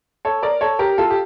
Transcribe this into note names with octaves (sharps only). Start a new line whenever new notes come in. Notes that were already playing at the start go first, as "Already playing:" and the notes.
A4 C#5
A#4 D5
A4 C#5
G4 A#4
F4 A4
G4